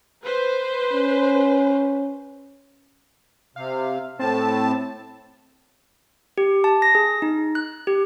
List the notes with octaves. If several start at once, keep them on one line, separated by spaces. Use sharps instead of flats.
B4 C5
C#4
C3 F5
A2 C4 A5
G4
A5
A#6
G#4
D#4
F#6
G4